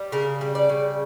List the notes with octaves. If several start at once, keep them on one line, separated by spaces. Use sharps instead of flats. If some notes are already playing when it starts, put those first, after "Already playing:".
Already playing: G3
C#3 A#4
G3
D5
C#3